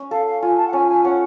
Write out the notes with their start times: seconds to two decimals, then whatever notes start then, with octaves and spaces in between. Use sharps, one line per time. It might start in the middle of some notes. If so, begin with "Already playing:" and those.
Already playing: C#4
0.11 A4 F5
0.27 F5
0.42 F4 G#5
0.57 A5
0.68 F#5
0.73 C#4 G#5
0.88 G#5
1.04 C#4 F#5